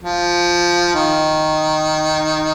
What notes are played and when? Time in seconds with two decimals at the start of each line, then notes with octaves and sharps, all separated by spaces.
0.04 F3
0.95 D#3